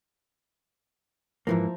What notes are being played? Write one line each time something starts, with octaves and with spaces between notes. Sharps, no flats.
G#2 E3 F3 A#3 E4 A#4